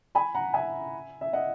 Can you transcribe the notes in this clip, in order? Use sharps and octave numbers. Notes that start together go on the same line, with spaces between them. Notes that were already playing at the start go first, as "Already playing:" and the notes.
G#5 B5
F#5 A#5
E5 G#5
E5
D#5 F#5